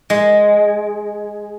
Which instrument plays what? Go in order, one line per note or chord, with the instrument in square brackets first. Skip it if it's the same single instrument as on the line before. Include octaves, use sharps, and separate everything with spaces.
[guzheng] G#3